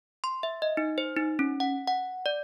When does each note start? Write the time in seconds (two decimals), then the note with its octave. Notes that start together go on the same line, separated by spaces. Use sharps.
0.24 C6
0.43 E5
0.62 D#5
0.77 D#4
0.98 C5
1.16 D#4
1.39 C#4
1.60 F#5
1.88 F#5
2.26 D5